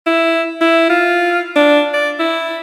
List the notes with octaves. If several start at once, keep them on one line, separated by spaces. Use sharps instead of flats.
E4
E4
F4
D4
D5
E4